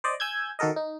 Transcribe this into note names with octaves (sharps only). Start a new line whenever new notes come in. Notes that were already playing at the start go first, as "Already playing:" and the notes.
C5 D5 D#5
G#5 E6 G6 G#6
D#3 F#4 A4 A#4 D#5
D#4